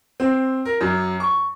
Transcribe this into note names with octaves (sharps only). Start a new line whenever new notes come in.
C4
A#4
F#2
C#6